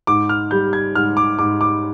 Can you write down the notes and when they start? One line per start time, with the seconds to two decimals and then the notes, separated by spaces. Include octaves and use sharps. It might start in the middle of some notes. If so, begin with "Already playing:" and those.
0.07 G#2 D6
0.29 F6
0.51 G3 G6
0.73 G#6
0.95 G#2 F6
1.17 D6
1.39 G#2 D6
1.61 D6